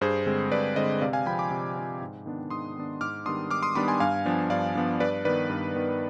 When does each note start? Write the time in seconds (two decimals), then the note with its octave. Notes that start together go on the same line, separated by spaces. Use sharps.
0.01 G2 G#4 C5
0.26 D3 G#3 C4
0.52 G2 B4 D5
0.76 D3 G#3 C4 C5 D#5
1.01 C3 D5 F5
1.13 F5 G#5
1.26 F3 C4 G5 B5
1.39 B5 D6
1.51 C3
1.76 F3 C4
2.01 G#2
2.26 D#3 B3 D4
2.50 G#2 C6 D#6
2.76 D#3 B3 D4
3.01 G#2 D6 F6
3.25 D#3 G3 B3 D4 C6 D#6
3.50 G#2 D6 F6
3.63 C6 D#6
3.75 D#3 G3 B3 D4 B5 D6
3.88 G#5 C6
4.00 G2 F5 G#5
4.25 F3 B3 D4
4.50 G2 D5 F5
4.75 F3 B3 D4
5.00 G2 B4 D5
5.25 D#3 B3 B4 D5
5.50 G2
5.75 D#3 B3